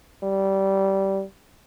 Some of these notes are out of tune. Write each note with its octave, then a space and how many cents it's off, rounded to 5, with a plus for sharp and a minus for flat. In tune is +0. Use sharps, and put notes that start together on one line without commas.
G3 -15